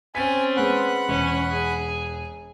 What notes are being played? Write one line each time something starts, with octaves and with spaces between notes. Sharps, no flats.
C4 C#4 G#5 A6 B6
G#3 B3 F#5 B5 F#6
E1 C#4
G#4